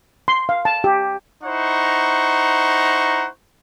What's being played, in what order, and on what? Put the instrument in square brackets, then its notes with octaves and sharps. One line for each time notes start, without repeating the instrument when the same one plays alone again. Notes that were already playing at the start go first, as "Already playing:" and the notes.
[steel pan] C6
F5
A5
G4
[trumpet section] D#4 E4 C5 F#5 A#5 C#6